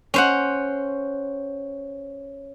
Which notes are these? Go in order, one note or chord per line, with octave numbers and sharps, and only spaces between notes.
C#4 C5 F#5